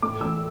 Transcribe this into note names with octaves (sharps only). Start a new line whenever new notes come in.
A2 D6
E3 A3 E6